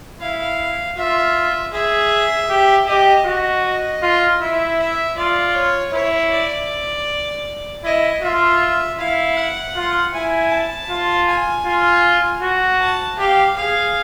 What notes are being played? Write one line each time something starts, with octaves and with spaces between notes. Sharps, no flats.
E4 F5
F4 E5
G#4 E5
G4
G4 D#5
F#4
D#5
F4
E4 E5
E5
F4 D5
C#5
E4 C#5
D5
E4 D#5
F4 E5
E4 F5
F#5
F4
E4 G#5
A5
F4
G#5
F4
F#4
A5
G4 F5
G#4 F5